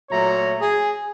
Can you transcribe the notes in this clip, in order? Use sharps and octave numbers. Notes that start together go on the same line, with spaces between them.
A#2 F#3 A3 C#5 A#5
G#4